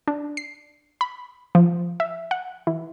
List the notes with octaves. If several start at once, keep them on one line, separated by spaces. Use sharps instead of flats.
D4
C7
B5
F3
E5
F#5
E3